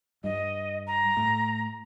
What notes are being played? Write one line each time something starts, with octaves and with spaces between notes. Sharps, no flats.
G2 D#5
A#5
A2